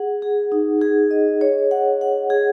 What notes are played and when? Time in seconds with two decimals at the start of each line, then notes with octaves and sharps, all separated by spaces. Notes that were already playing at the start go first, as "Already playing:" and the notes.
Already playing: G#4 F#5
0.22 G#4
0.52 D#4
0.82 G#4
1.11 D#5
1.41 C#5
1.71 F#5
2.01 F#5
2.30 G#4